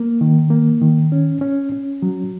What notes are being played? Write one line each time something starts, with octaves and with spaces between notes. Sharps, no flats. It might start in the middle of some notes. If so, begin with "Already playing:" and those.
Already playing: A#3
D#3
A#3
D#3
C#4
C#4
C#4
F#3